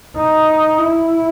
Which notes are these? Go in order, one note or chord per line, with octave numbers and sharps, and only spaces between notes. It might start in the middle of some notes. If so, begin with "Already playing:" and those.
D#4
E4